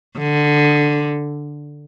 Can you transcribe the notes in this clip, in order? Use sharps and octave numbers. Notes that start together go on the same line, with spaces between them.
D3